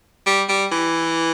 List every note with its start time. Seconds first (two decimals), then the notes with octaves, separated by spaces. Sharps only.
0.26 G3
0.49 G3
0.72 E3